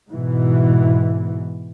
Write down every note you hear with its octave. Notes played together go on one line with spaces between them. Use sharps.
G#2 B2 E3